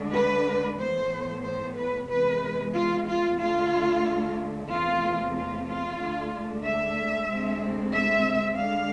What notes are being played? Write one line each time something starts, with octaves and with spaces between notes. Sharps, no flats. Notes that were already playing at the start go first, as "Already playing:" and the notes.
Already playing: D2 D3 G#3 D4
B4
A2 E3 B3 C5
C5
B4
E2 C3 E3 G#3 B4
F4
F4
D2 D3 A3 F4
E2 C3 E3 A3 C4 F4
F4
F4
D2 D3 A3 D4
E5
D2 C3 G#3 C4
E5
D3 G#3 D4 F5